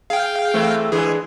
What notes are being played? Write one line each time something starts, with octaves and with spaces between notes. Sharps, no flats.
G#4 F5 G5
E3 A3 C4
D3 E3 G#3 G#4